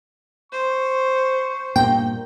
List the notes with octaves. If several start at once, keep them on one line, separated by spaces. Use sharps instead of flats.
C5 C#6
G2 A#2 A#3 G5